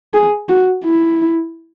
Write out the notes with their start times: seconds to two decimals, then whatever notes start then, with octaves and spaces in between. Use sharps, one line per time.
0.13 G#4
0.49 F#4
0.84 E4